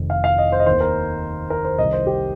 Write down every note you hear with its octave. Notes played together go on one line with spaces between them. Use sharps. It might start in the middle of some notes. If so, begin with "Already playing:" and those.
Already playing: F1 F2 D#3
F5
F5
D#5
C5
D#5
D#2 D#3 C5
A#4
A#4
C5
C2 C3 D#3 D#5
C5
G4